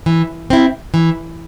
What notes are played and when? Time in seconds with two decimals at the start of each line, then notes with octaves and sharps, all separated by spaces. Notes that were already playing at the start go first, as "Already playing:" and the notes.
0.06 E3
0.50 C4 E4
0.94 E3